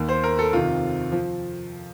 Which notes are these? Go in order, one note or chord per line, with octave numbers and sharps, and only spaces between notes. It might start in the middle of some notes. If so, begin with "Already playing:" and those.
Already playing: D#2 D#3
C5
A#4
A4
F2 C3 D#3 F4
F3